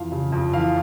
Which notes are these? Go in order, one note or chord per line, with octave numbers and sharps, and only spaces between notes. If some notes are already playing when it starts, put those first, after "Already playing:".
Already playing: F2 E3 F5
C#3
F2
E3 F5